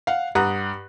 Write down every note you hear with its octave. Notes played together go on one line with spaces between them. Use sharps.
F5 F#5
G2 F#5 A#5 D#6 F#6